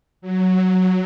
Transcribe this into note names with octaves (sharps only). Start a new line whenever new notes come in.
F#3